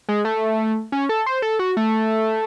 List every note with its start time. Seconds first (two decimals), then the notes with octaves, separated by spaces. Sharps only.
0.09 G#3
0.25 A3
0.92 C#4
1.09 A4
1.26 C5
1.42 A4
1.59 F#4
1.77 A3